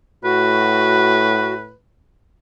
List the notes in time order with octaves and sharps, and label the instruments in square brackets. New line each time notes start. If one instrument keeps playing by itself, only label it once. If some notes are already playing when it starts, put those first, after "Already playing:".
[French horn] A2 [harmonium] F#4 [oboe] B4